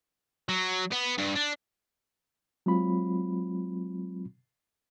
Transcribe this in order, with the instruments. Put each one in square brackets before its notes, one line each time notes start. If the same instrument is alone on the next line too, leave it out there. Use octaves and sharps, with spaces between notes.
[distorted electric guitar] F#3
B3
G2
D4
[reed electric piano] F#3 G#3 C4 F4 B5